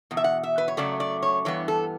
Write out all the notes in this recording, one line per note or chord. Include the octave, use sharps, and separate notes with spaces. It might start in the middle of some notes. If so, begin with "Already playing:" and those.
E2 B2
E5
F#5
E5
B4
C#5
F#2 C#3 F#3 A3 D5
D5
C#5
G2 E3 B3 C#5
A4